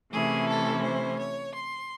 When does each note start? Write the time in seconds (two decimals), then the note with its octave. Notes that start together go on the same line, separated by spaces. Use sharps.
0.12 C3 E3 A3 C#4 E4 G#4
0.48 A4
0.83 C5
1.19 C#5
1.55 C6